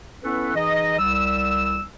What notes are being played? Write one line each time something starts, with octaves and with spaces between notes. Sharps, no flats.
B3 C#4 E4 A4 B4
E3 D#4 G#4 D#5
C2 G3 E6